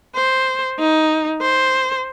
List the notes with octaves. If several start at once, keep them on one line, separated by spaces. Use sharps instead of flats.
C5
D#4
C5